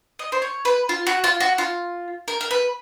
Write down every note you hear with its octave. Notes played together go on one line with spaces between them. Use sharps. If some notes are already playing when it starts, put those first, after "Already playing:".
D#5
C5
C#5
B4
F4
F#4
F4
F#4
F4
A#4
A#4
B4